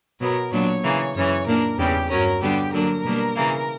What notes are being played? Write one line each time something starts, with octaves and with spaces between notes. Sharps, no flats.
B2 F#3 B3 A#4
A#2 F#3 B3 D4 C#5
C#3 E3 A#3
F#2 C#3 E3 C#5
A#2 A#3 D4 A#4
E2 C#3 G3 G4
G2 F#3 C#4 A#4
D3 G3 B3 D4 G4
D3 F#3 A#3 D4 A#4
B2 G3 A#3 D4
C#3 E3 A#3